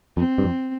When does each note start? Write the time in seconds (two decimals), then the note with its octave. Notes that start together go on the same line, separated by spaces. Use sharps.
0.17 F2 C4
0.38 G2
0.44 F2